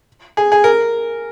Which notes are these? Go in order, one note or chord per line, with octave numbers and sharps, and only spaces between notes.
G#4
G#4
A#4